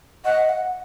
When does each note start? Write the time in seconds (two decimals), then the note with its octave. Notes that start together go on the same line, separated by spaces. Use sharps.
0.25 D#5 F#5
0.49 F#5